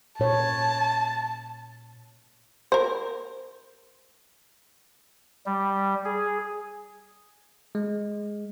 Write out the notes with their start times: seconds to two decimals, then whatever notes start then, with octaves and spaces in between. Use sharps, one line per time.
0.20 A#2 C#5 A5
2.72 A#4 C5
5.46 G3
6.05 G#4
7.75 G#3